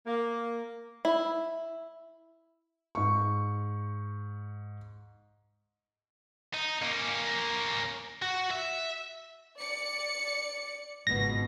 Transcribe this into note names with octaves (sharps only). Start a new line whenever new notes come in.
A#3
E4
G#2 C#6
D#4
A#3 C#4
F#4
E5
D5 C#7
G#1 C#2 B2 A#6